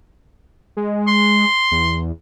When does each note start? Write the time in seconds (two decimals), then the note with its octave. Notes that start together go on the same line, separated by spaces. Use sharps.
0.77 G#3
1.07 C6
1.72 E2